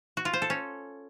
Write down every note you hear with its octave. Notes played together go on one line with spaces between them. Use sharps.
F#4
F4
C5
A4
C#4